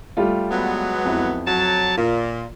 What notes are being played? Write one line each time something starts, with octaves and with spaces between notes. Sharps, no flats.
G3 A3 F4
F#3 G#3 B3
F2 E4
F#3 A5
A#2 F4